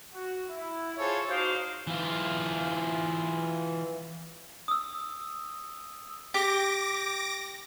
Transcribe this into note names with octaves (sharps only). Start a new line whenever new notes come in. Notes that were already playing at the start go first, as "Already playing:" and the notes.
F#4
E4
F4 G#4 A4 C5 C#5
D#4 F#4 C5 F5 D6
E3 F4
D#6 E6
G4 D6 A#6